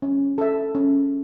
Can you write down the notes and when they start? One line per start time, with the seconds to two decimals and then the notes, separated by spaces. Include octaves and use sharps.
0.02 C#4
0.38 A4 E5
0.75 C#4